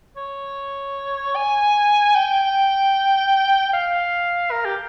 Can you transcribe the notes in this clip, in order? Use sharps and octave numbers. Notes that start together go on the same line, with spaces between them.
C#5
G#5
G5
F5
A#4
G4